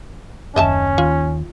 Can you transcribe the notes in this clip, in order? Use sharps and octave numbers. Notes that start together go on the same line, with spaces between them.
F#1 D#2 C#4 D#5 E5 A5
D#2 F4